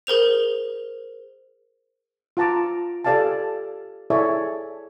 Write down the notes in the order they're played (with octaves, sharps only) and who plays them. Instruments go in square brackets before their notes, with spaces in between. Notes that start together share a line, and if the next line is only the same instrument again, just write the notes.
[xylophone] G#4 A#4 C5 F7
[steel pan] F4 F#5 A5 A#5 D6
G4 A4 D5 F5 G#5 A5
E4 G#4 A4 C#5 D5 E5